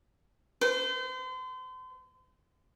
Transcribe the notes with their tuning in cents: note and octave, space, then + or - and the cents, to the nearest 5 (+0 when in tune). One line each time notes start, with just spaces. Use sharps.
C5 -35